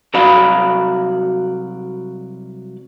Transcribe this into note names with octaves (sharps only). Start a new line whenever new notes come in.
C2 F#3 F#4 D5 F5 B5